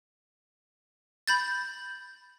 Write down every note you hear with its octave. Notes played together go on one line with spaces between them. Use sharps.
B5 G6 A6